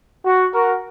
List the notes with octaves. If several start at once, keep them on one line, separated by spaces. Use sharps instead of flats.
F#4
F#4 A#4